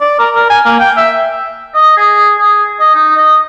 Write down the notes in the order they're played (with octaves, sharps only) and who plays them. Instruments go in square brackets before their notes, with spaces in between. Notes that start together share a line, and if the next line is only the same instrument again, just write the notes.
[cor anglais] D5
A#4
A#4
G#5
A#3
G5
E5
[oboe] D#5
G#4
G#4
D#5
D#4
D#5